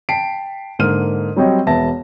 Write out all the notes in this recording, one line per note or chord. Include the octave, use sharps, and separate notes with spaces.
G5 A5 B6 C7 D7
G#2 D3 A#3 F6 D#7
F#3 G3 C4 C#5 D#5 G5
E1 B3 E5 A5 A#6